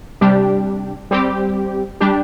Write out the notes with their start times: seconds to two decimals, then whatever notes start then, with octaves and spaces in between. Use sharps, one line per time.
0.21 C3 G3 D4 G4
1.11 G3 C4 G4
2.00 G3 D4 G4